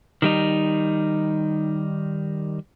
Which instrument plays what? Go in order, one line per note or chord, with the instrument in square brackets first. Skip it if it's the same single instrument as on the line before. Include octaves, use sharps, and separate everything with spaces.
[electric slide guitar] D#3 G3 D#4